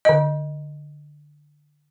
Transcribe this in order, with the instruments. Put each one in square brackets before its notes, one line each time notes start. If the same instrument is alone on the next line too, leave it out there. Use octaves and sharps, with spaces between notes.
[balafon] D3 D#5